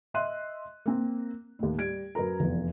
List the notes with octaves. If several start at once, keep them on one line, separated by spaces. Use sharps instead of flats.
D#5 E5 C6 F#6 D#7
A#3 C4
D#2 A2
G3 G#6 D7
F#2 A#4 B4 A#5
F1 E2